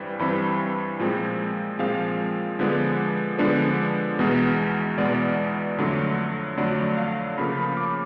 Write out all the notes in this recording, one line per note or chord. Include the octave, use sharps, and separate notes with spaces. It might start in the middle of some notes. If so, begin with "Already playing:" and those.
Already playing: G2 E3 G3 C4
G2 E3 G3 C4 B5
A#2 F3 G#3 C4
A#2 F3 G#3 C4 F5
D3 F3 G#3 B3 D4
D3 F3 G#3 B3 D4
E2 B2 G#3 B3
E2 B2 G#3 B3 D5
F2 D3 F#3 A3
F2 D3 F#3 A3 D5
F5
C#3 F3 A#3 B5
B5
D6